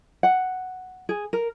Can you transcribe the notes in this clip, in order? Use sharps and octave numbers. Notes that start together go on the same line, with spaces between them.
F#5
G#4
A#4